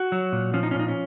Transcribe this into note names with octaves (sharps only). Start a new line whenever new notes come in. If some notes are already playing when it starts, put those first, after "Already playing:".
Already playing: F#4
F#3
A#2
F3 C#4
D#4
C#4
A#2 D#4
C#4